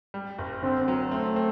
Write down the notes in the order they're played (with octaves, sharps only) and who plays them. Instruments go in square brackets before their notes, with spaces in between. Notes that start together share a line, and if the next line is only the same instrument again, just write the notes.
[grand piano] G3
F#1
[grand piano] D3 [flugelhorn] C4
[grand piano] F#3
[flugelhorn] A3 [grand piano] C4
[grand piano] C4